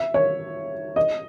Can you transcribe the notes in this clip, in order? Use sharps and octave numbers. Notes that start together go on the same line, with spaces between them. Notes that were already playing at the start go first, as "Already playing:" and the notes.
Already playing: E5
C#5
D#5